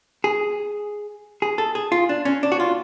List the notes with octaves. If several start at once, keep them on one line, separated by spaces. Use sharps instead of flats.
G#4
G#4
A4
G#4
F4
D4
C#4
D4
F#4
F4